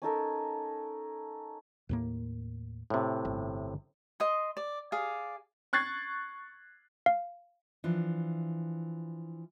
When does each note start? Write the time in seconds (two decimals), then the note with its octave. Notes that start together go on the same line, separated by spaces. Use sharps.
0.02 C#4 D#4 A4 A#4
1.89 D#2 A2 A#3
2.90 A2 C3
3.25 G1
4.20 D#5 C6
4.57 D5
4.92 G#4 D5 F5
5.73 C#6 F#6 G#6 A6 C7
7.06 F5
7.84 E3 F3 D4